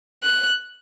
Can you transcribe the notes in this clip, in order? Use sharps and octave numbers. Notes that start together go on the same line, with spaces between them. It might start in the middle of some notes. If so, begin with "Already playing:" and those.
F#6